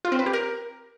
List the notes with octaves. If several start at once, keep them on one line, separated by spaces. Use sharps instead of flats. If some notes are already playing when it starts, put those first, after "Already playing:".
F4
C4
B4
G4
A#4